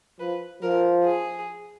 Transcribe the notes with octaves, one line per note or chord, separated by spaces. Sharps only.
F3 B4
F3 A#4
G#4